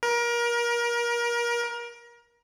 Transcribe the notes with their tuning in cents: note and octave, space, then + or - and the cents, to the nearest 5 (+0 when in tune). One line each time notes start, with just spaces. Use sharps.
A#4 +30